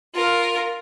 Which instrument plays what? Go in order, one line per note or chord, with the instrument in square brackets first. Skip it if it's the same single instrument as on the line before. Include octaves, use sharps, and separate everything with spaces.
[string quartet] F4 A#4